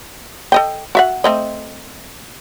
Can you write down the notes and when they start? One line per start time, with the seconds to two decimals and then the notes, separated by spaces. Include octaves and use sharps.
0.52 A4 D#5 G5
0.95 F#4 E5 F#5
1.24 A3 C4 D#5